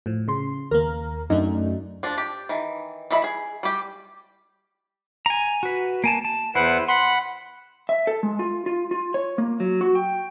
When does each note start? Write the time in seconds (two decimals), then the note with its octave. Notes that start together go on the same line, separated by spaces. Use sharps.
0.06 A2 F3
0.28 C#3 C6
0.71 D#2 A#3 A#4
1.30 F#2 A3 D4 D#4
2.03 F3 D4
2.18 G4
2.49 D#3 E3
3.11 E3 D#5 E5 B5
3.24 G#4
3.63 G3 G4
5.26 G#5 A#5
5.63 F#4 B4
6.04 A#3 G#5 A5
6.25 A5
6.55 E2 E4 B4 C5 F#5
6.88 F#5 B5 C6
7.89 E5
8.07 A4
8.23 G#3
8.39 F4
8.66 F4
8.91 F4
9.14 C#5
9.38 A#3
9.60 F#3
9.81 F#4
9.95 G5